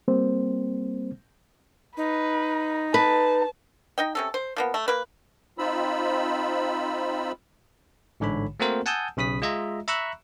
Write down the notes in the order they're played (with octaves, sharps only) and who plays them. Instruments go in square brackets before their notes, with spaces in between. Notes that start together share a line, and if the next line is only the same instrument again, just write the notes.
[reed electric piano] G3 A#3 C4 C5
[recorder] D#4 [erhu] B4
[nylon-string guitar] B4 [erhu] A5
[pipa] D#4 D#5 G5
C3 C#4 A4
C5
F3 A#3 B3
A3
A#3 B4
[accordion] C4 D#4 F4 B5 E6
[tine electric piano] A1 G#2 D3 C#5 B5
A3 A#3 C4 F#4 A#4 C5
F#5 G#5 A5 D#6 E6 G6
B1 C#3 B5 D#6 B6
G#3 F4 D#5 E5 A#5
E5 A#5 B5 C#6 E6 F#6